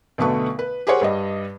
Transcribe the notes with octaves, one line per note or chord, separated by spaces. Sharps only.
B1 B2 D3 A3 B4 C#6
B4
G4 G#4 A#4 C5 C#5 F#5
G2 G3 D#5